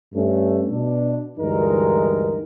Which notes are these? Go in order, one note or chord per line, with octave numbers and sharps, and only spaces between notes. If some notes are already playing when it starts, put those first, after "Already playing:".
G2 A3 C#4
B2 D4
D2 G2 E3 G#3 D#4 A#4